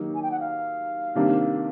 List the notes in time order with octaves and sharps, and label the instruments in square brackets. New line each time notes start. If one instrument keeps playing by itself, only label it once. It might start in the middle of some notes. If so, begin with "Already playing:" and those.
Already playing: [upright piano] D#3 F#3 A#3 D#4 G4
[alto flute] G#5
G5
F#5
F5
[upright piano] C3 D#3 G3 A#3 D4